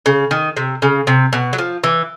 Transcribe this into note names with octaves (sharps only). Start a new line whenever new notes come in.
C#3
D#3
C3
C#3
C3
B2
F#3
F3
E3